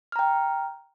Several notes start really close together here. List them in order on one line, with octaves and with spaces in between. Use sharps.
F6 A#5 G5